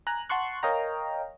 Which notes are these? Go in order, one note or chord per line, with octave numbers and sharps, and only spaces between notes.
G#5 A#5 F#6
F#5 A5 C6 C#6 F#6
A#4 C#5 D#5 F5 G5 A#5